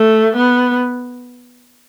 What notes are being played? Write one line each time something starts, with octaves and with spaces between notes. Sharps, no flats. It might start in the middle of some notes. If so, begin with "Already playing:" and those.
Already playing: A3
B3